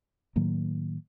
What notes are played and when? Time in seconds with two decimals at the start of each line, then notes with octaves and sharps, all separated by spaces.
0.36 A2 D#3 F#3 A#3